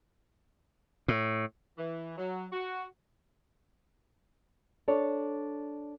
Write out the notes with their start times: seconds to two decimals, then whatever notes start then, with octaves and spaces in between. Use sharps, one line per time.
1.08 A2
1.78 E3
2.18 F#3
2.52 F#4
4.88 D4 A4 C#5 D5